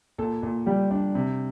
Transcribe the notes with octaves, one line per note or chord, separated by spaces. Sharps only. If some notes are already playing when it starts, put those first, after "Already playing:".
A#2 A4
A#2
G3 G4
D4
C3